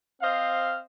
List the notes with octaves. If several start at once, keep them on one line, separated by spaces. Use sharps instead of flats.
C4 C5 D#5 F5